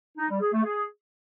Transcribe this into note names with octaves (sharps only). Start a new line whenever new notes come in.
D#4
G3
G#4
A3
G#4